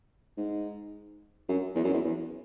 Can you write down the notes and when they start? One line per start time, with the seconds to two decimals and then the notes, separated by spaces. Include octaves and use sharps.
0.37 G#2
1.49 F#2
1.76 E2
1.84 F#2
1.93 E2
2.04 E2